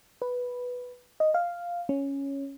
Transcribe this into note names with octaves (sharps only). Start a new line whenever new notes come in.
B4
D#5
F5
C#4